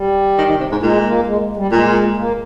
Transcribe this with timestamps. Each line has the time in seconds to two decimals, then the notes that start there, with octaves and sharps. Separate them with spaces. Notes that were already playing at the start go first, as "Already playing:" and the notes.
Already playing: G3
0.38 D#3
0.49 D#3
0.60 C3
0.72 G#2
0.83 A#2 G#3
1.05 A#3
1.27 G#3
1.57 G3
1.72 A#2 G#3
2.17 A#3